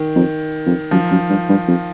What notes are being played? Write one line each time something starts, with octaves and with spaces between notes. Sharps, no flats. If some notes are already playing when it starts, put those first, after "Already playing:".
Already playing: D#3
F2
F2
F#2 F3
F#2
G2
G2
F2